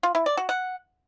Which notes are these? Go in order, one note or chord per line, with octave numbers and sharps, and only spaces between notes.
F4
E4
D5
F#4
F#5